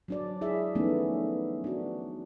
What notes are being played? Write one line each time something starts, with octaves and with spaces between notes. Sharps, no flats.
F#3 D4 D5
E4 G#4 E5
D#3 F3 A3 B3 C#4 D#4
D4 F#4